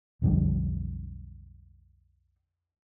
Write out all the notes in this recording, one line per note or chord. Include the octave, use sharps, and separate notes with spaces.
B1 F2 D3 G3